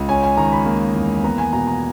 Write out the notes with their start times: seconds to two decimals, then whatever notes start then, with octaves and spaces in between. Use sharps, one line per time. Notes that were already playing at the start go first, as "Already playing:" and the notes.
Already playing: C#2
0.09 C#4 G#5
0.23 G#5
0.37 D#3 A#5
0.52 B5
0.66 A#3
0.95 E2
1.24 B3 A#5
1.38 G#5
1.52 B2 A#5
1.67 A#5